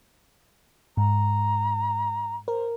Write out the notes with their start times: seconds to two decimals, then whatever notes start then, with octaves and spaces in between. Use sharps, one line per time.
0.97 G#2 A#5
2.48 A#4 C5